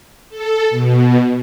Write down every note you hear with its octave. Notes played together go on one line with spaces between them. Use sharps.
A4
B2